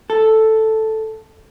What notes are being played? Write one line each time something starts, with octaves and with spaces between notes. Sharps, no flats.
A4